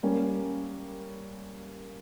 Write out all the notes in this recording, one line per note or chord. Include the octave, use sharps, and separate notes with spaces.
G3 A#3 C#4